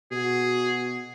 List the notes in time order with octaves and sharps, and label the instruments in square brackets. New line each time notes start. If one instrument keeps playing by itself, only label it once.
[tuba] B2 [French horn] F#4 [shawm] G#4